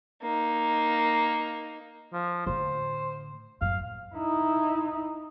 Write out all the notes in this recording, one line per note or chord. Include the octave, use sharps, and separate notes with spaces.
A#3 D#4
F3
A2 D3 C5
A1 F#2 F5
D#4 E4